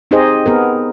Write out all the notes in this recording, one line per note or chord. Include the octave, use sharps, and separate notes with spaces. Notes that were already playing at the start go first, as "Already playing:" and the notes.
C4 D#4 G4 G#4 C5 D#5
B3 G#4 A#4